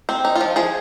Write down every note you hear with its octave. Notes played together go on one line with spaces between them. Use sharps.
C4
D#4
F4
F3
F3 G#4